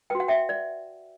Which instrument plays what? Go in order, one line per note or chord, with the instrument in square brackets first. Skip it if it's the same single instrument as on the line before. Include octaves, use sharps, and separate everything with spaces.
[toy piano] F#4 B4 G5
F#5
E5 G5
D5